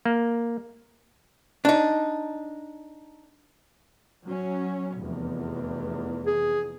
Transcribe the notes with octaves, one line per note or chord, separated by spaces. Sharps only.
A#3
D4 D#4
F#3 C#4
F1 E2
G#4